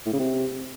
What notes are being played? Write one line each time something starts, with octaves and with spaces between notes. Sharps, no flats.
A2
C#3
C3